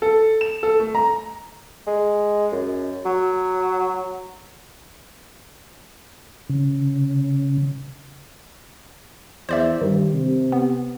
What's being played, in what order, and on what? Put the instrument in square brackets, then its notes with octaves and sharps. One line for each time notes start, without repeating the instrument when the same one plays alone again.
[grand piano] A4
E7
A4
A3
A#5
[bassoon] G#3
F#2
F#3
[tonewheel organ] C#3
[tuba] E2 [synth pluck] C5 D5 E5
[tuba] G2 [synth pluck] D#3
[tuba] C3
[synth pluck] B3